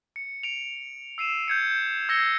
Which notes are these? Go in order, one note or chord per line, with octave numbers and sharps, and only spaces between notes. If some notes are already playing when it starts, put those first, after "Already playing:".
C#7
C#7 D7 F7
E6 C7 D#7 E7
G6 G#6 C#7
E6 G#6 A#6 C7 C#7 G7